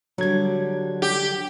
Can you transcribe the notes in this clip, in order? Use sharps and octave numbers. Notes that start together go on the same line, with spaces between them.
D3 F#3 G3 G#6
G4